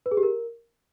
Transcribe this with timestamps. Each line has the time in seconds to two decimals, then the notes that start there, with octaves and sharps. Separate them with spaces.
0.06 B4
0.12 G#4
0.17 G4
0.23 A#4